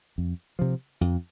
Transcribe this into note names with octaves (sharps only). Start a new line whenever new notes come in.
F2
C3 F3
F2